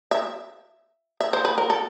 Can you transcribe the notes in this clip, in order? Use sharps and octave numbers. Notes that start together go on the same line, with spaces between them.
E5
E5
C5
B4
A#4
A4